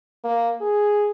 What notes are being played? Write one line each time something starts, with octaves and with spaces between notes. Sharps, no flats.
A#3
G#4